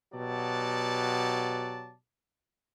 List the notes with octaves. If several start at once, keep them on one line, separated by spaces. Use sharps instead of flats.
B2 F#3 G4 D5 A5